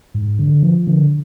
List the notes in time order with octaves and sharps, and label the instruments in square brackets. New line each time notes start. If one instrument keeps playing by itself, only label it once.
[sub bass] G#2
D3
F3
D3